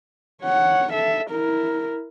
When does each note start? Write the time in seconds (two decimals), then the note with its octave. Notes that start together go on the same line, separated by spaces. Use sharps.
0.42 C#5 F#5
0.92 A4 E5
1.31 E4 A#4